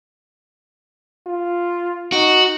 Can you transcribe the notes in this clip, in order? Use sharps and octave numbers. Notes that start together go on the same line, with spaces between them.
F4
D#4 F#4